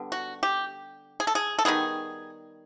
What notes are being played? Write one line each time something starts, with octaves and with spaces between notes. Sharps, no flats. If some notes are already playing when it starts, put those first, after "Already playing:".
Already playing: D3 G3 B3
F#4
G4
G#4
A4
G#4
A4
D#3 G3 B3 G#4